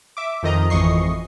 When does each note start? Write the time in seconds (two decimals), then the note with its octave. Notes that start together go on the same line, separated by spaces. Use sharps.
0.17 E5 D6
0.43 F2 D#3 D#5 A#5
0.70 G#1 F2 E3 D#5 C#6 C7